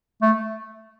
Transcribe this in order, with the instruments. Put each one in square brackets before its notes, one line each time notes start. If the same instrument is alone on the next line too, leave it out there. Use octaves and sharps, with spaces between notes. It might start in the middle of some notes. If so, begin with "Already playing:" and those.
[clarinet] A3